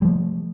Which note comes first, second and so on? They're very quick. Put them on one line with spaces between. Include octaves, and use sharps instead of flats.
G3 F3 A3